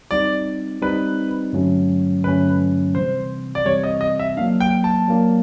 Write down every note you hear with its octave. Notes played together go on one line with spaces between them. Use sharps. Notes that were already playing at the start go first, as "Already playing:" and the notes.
G3 C4 D#4 D5
G3 C4 D#4 B4
G2 D3 F#3 A3 C#4
G2 D3 F#3 A3 C#4 B4
C3 E3 G3 C4 C5
D5
C3 E3 G3 C4 C#5
D#5
D#5
E5
F#3 A#3 D4 F5
G5
A5
F#3 A#3 D4